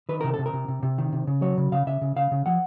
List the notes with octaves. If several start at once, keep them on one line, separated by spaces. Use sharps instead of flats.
D#3 B4
C3 A#4
A4
C3
A#4
C3
C3
C3
D#3
C3
C#3
F#3 C#5
C#3
C#3 F5
C#3 E5
C#3
C#3 F5
C#3
F3 F#5